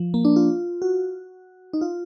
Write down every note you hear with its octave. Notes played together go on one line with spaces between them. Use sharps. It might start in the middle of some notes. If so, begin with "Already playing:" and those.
Already playing: F3
A#3
D4
F4
F#4
D#4
F4